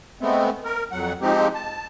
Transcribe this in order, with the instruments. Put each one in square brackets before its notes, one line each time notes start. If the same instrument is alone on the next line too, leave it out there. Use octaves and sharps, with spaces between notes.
[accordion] G#3 A3 B3 C4
A#4
F2 F#3 F#5
F3 G#3 C4 D#4 G4
A5